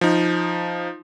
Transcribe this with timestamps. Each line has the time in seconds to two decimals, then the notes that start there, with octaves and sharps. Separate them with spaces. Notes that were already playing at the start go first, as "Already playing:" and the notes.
0.01 F3 D#4